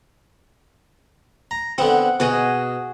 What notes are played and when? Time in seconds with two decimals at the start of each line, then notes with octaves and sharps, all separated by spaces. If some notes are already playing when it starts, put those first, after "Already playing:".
1.51 A#5
1.78 D3 B3 C4 F#5
2.20 B2 F#4 G#4 D#5